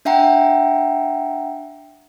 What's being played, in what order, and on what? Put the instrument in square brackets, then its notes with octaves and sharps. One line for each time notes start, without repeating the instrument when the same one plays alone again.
[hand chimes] D4 E5 F#5 G5 A#5